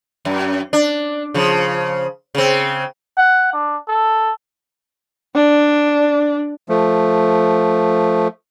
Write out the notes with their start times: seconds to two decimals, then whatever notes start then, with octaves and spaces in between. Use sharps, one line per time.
0.25 F#2
0.73 D4
1.34 C#3 F3
2.35 C#3 C4
3.18 F#5
3.53 D4
3.88 A4
5.35 D4
6.69 F3 A3